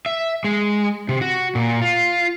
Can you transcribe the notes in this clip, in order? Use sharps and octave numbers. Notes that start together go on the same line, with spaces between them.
E5
G#3
C3
F#4
A#2
F4